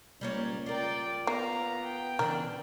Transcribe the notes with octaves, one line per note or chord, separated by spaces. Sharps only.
C#2 G3 A#3 C#5
F4 A#4 D5 G5
A#3 B3 F5 A#5
G5
C#3 E3 D4 A#4